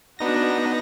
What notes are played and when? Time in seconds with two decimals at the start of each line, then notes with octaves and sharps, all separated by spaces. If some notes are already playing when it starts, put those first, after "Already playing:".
0.19 B3 D4 D#4 F#4 A#6